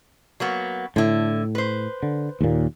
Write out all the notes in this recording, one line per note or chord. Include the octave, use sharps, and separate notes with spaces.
F#3 A#3 B3
A2 D3 E4
B4 C5
D3
D#2 A#2